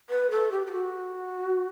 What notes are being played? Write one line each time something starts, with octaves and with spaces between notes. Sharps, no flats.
B4
A4
G4
G4
F#4